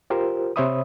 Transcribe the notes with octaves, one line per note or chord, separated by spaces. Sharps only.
F4 G4 A#4 C5
C3 C5 C#5 E5 B5 D#6